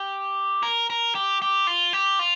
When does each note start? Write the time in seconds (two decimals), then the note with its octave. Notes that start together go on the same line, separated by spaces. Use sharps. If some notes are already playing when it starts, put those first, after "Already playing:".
Already playing: G4
0.63 A#4
0.90 A#4
1.15 G4
1.42 G4
1.67 F4
1.93 G4
2.19 F4